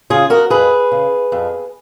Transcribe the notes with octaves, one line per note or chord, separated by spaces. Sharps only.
C#3 F4 G#4
F#4 A#4
F2 G#4 B4
C#3
F2